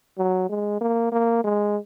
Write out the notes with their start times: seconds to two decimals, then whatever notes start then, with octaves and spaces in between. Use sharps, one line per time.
0.18 F#3
0.49 G#3
0.81 A#3
1.12 A#3
1.44 G#3